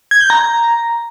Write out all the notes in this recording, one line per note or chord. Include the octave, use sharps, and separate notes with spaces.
G#6
G6
A#5